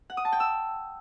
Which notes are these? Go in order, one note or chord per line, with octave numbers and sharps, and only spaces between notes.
F#5
D#6
A5
G5
E6